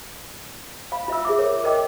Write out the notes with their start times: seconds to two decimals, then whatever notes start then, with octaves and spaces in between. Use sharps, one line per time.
0.92 F5 B5
1.08 F4 E5 F5 E6
1.25 G#4 E5 D6
1.39 A#4 C#5
1.64 A#4 D#5 G5 D6